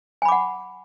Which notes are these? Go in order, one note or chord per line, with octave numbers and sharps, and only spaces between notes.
F#5 G#5 B5 D6